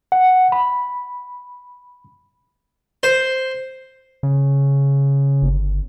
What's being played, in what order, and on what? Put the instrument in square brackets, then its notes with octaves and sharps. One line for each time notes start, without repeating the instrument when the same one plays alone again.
[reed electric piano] F#5
B5
[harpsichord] C5
[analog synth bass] C#3
[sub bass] G1